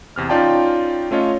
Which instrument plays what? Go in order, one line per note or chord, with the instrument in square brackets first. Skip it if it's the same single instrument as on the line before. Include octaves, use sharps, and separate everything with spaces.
[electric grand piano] E2 C3 F6
C#4 D#4 F4 D5 G5 A5
A3 C#4 F4 C#5 D#5